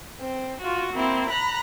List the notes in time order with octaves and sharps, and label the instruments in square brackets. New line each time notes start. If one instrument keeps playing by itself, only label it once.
[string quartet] C4
F4 F#4
A#3 C4 E4
A#5 B5 F#6